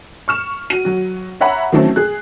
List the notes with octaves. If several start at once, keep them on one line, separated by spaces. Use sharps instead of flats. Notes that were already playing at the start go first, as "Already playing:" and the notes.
C#6 F6 E7
F#4 D#7
F#3 F#4
C#5 E5 F#5 A#5 B5
D#3 E3 F#3 A3 C4 C#4
G#4 F#6